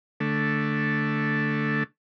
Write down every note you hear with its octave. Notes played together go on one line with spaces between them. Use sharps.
D3 A3